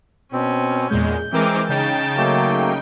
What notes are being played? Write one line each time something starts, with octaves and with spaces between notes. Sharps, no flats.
B2 C4 C#4
E2 A#2 G#3 G6
E3 G#3 C4 A#4 D6
C#3 D#4 G5 A5
F#3 A3 A#3